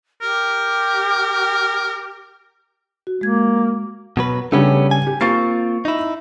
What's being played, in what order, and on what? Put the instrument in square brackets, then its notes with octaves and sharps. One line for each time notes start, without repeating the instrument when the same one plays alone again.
[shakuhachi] G4 [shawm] A#4
[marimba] F#4
[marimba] G#3 G#6 [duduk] A#3
[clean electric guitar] B2 F#3 B4
[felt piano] C#3 G3 D4 [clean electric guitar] A3 B3 C#4
[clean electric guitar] G#5
[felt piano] G4
[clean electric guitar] A#3 C4 F4 [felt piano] C#6 A6 C7
[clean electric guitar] D#4 E4